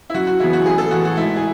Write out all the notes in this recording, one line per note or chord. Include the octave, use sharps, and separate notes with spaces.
E4
F#2 F#4
F#4
C#3 E3 B3 E4
F#4
A1 G#4
A4
A2 E3 F#4
F#4
G#2 E4
G#4